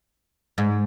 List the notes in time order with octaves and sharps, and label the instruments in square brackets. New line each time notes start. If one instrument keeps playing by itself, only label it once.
[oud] G#2